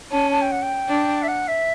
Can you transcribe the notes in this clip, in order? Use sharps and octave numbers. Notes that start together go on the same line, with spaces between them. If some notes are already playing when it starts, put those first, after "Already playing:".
C#4 A5
A5
G5
F#5
G5
D4
E5
F#5
E5